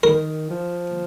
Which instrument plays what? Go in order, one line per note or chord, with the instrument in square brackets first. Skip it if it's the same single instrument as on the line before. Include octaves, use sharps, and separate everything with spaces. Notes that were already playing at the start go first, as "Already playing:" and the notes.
[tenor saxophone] D#3 [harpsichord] A#4
[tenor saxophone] F3